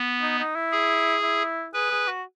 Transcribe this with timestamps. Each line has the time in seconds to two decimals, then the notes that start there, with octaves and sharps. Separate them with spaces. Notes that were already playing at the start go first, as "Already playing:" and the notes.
Already playing: B3
0.22 D#4
0.38 D#4
0.56 E4
0.72 G#4
1.23 E4
1.74 G#4 B4
1.91 G#4
2.08 F#4